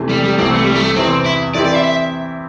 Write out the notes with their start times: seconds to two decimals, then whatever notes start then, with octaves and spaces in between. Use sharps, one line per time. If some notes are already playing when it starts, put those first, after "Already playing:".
Already playing: E2 C3 E3 A3
0.09 G3
0.24 G3
0.38 C2 C3 E3 C4
0.51 A3
0.64 G3
0.76 A3
0.96 E2 C3 E3 C4
1.26 E4
1.54 E3 C4 E4 G4 D5
1.65 D5
1.74 E5
1.84 E5